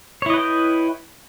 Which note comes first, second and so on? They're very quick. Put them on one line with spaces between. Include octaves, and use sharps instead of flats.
C#5 E4 D#5 B4 G5